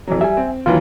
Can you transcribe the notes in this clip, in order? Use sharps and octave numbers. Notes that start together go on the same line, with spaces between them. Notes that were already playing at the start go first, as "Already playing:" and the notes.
F2 E3 F#3
G3 E5 G#5
C4
D#2 E3 F#3 F4 B4